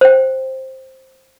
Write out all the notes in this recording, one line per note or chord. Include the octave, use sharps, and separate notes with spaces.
C5 G5